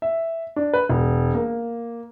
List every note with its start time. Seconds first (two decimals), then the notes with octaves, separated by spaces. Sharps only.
0.02 E5
0.56 D4
0.74 B4
0.89 E1
1.34 A#3